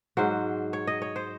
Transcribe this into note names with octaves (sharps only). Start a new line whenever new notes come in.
G#2 F#3 C5
C#5
D#5
C#5
C5